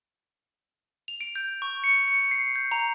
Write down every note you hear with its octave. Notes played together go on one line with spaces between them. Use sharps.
F7
D7
G6
C#6
C#7
C#7
C7
G6
A#5